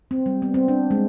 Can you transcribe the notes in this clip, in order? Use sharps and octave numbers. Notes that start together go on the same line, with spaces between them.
C4
G3
B3
C4
D4
G#3